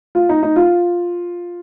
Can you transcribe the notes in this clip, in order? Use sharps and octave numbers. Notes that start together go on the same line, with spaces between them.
F4
D#4
D#4
F4